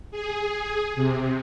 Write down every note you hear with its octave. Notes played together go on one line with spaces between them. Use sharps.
G#4
C3